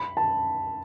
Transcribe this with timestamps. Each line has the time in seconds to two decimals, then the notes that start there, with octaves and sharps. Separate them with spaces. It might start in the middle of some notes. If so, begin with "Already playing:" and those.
Already playing: B5
0.17 A5